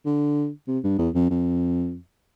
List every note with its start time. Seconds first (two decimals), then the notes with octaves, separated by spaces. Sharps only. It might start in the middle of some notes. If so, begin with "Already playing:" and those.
0.05 D3
0.68 C3
0.84 G2
0.98 E2
1.15 F2
1.30 F2